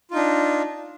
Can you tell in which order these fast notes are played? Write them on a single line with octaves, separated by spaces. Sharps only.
F4 D#4 D4